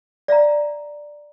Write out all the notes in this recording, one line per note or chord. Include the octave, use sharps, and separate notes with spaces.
D5 E5 F5 A#5